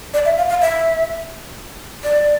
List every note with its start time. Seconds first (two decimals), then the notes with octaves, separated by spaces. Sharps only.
0.14 D5
0.25 E5
0.37 F5
0.49 F5
0.61 E5
2.04 D5